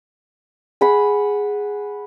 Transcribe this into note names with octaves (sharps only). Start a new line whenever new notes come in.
G#4 F#5 B5